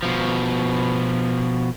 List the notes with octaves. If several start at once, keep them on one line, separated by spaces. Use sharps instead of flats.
B2 F3